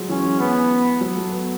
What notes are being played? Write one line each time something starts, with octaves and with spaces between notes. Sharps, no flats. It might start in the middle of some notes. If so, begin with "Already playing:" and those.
Already playing: F#3 G#3
E3 C#4
B3
F#3
A3
B3